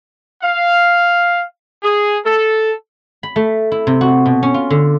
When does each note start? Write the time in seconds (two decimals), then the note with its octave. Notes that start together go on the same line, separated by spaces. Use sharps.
0.43 F5
1.83 G#4
2.25 A4
3.23 B5
3.36 A3
3.72 E4
3.87 C3
4.01 F#4
4.26 B2
4.43 C#4
4.54 F4
4.70 D3